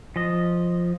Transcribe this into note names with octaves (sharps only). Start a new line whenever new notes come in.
F3 D#5